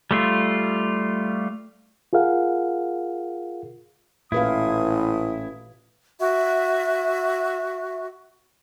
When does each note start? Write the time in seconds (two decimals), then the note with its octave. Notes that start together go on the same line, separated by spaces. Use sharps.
0.11 G3 A3 F4
2.13 F4 G#4 A#4 F5 F#5
4.32 A1 A#2 E4 B4 F5 D#6
6.19 F#4 E5